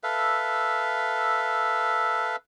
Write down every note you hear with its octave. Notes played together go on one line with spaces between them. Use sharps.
A4 B4 E5 F5